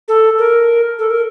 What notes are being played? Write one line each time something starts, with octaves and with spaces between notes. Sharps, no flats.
A4
A#4
A4
A#4